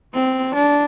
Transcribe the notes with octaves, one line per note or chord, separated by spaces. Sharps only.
C4
D4